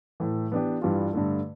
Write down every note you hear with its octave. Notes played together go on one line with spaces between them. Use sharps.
A2 E3 A3
E3 B3 D4 G4
G2 E3 G3 D4 F4
G2 D3 A3